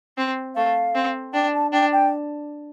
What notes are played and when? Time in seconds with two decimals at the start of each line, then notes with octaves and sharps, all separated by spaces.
0.17 C4
0.56 A3 F5
0.95 C4
1.34 D4 G5
1.53 A5
1.72 D4 G5
1.93 G5